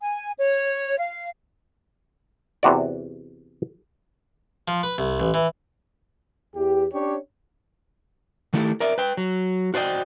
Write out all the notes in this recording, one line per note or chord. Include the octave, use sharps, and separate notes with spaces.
G#5
C#5
F5
E2 C3 F#4 D5
F3
B4
C2
A1
E3
E2 G4
C#4 D4 G4 C#5
D#3 A3 E4 G4 A4
A#4 D5 E5
B4 G5
F#3
F#4 C5 D5 D#5 G5